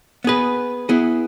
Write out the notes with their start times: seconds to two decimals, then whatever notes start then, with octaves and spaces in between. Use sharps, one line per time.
0.24 B3 G#4 B4
0.89 B3 E4 G#4